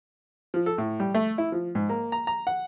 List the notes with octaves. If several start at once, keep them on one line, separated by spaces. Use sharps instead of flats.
F3
A4
A2
G3
A3
E4
F3
G#2
A#3
A#5
A#5
F#5